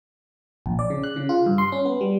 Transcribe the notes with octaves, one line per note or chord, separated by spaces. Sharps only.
A#1
D5
C#3
F#6
C#3
F4
G2
C6
C#4
B3
G3